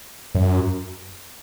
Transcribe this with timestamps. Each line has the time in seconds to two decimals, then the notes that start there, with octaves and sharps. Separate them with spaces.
0.35 F#2